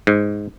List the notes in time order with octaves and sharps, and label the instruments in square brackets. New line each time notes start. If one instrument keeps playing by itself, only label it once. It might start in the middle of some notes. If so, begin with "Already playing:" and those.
[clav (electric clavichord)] G#2